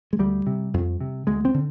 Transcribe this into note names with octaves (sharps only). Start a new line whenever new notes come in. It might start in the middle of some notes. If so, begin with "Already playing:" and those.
G#3
D2 G3
C3
F2
C3
D2 G#3
C4
D3